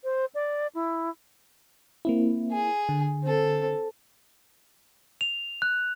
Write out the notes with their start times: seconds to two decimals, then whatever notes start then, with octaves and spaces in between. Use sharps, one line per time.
0.04 C5
0.35 D5
0.75 E4
2.05 A#3 C4 E4
2.51 G#4
2.89 D3
3.24 C4 A4
5.21 F7
5.62 F#6